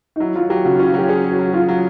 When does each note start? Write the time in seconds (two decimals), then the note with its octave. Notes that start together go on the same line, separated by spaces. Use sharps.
0.16 D#4
0.20 F#3 E4
0.35 F#3 F4
0.49 F#3 G4
0.65 C#3 F#4
0.76 F4
0.79 C#4
0.87 F#4
0.94 F#3 G4
1.09 C#4 G#4
1.24 F#3
1.31 F#4
1.39 F#3
1.53 F#3 F4
1.69 F#3